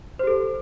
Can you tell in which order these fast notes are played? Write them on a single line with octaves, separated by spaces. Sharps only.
C5 G4 A4